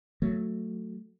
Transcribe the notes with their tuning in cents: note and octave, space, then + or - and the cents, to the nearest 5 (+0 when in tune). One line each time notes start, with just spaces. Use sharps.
F#3 -10 A3 +5